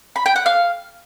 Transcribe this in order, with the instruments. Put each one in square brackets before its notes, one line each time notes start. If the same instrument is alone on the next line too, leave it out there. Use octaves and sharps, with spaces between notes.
[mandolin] B5
G5
F#5
F5